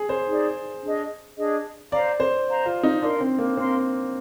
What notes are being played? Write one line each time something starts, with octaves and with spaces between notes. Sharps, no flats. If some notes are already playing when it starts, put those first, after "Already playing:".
Already playing: G#4
C5
D#4 G#4 D5
D4 G#4 D#5
D4 G#4 D#5
C5 D5 F5 A#5
C5
C5 F5 A#5
F4
D#4
D4 A#4 F5 C6
C4
A#3
C4 A#4 F5 C6